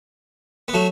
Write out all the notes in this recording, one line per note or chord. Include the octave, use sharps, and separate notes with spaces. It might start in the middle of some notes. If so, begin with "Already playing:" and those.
B3
F#3 A3